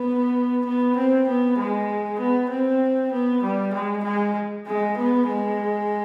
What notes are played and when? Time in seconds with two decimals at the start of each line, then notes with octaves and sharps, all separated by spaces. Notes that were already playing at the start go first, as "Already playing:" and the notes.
Already playing: B3
0.65 B3
0.96 C4
1.28 B3
1.58 G#3
2.20 B3
2.50 C4
3.12 B3
3.43 G3
3.74 G#3
4.04 G#3
4.67 G#3
4.97 B3
5.28 G#3